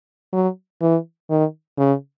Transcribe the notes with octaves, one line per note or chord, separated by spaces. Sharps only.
F#3
E3
D#3
C#3